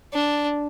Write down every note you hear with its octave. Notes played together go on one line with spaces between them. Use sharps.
D4